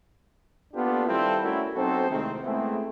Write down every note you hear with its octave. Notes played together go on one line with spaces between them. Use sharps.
A#3 B3 D4 F4 G4 A4
D#3 G3 C4 E4 F4 A4
A3 C#4 E4 F#4 A#4
B1 C4 D#4 F#4 A4 C5
A2 C3 D#3 G#3 A3 C4
G#3 A3 B3 C4 E4 G#4